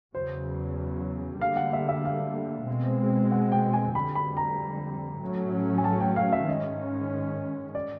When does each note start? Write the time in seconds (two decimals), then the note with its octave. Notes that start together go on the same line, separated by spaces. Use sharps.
0.14 E2 C#3 F#3 C5
1.41 D3 G3 A#3 F5
1.56 F#5
1.73 E5
1.89 E5
2.05 F5
2.68 B2 G#3 C4
3.32 F#5
3.52 G5
3.73 G#5
3.95 F2 D3 G3 B5
4.15 B5
4.37 A#5
5.21 A2 F#3 A3 C#4
5.78 G#5
5.84 A5
6.00 G5
6.16 F5
6.33 E5
6.48 G#2 D#3 G#3 C#4 D#5
7.75 D5